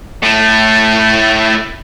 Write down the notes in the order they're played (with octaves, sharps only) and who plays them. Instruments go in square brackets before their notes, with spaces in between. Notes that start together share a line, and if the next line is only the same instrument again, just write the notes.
[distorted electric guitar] A2 A3